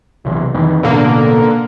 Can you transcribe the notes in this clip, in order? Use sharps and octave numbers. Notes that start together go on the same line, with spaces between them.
B1 C3 E3
F2 D#3 E3
A1 B2 D3 A#3